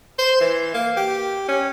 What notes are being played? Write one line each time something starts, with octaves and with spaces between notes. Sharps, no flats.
C5
E3
A#3
G4
C#4